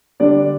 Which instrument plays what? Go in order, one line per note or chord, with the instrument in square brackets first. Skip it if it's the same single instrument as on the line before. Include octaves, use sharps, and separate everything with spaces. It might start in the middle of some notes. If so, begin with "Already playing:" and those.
[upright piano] D3 G3 D4 D5